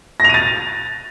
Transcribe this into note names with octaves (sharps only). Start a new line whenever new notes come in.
A6 A#6 D#7 F7